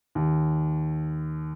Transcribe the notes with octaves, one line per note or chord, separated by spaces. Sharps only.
D#2